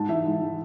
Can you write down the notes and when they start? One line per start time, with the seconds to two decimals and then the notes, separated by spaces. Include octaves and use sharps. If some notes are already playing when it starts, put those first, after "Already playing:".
Already playing: G#2 A5
0.09 E3 E5
0.25 G#2
0.42 E3